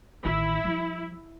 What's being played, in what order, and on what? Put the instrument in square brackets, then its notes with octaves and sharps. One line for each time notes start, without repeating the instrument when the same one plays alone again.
[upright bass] A1 D#3 [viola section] E4
[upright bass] F3 G3